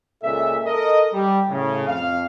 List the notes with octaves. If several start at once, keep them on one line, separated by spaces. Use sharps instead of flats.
C#2 A#2 A4 E5
A4 A#4 D#5
G3
A2 C#3
F2 F5